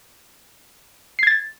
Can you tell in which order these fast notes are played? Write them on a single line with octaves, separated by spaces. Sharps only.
C7 G#6 A6